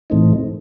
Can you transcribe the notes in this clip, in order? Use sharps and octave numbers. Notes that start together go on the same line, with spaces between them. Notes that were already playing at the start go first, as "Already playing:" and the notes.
A2 E3 A3 C4 D#4